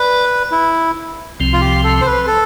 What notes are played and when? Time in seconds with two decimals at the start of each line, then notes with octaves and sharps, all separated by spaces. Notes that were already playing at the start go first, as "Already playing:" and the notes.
Already playing: B4 D5
0.51 E4
1.40 C2 C3 F3 C4
1.53 F4
1.61 G4
1.84 A4
2.01 C5
2.06 B4
2.27 A4